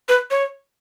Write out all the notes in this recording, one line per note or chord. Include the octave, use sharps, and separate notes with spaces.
B4
C#5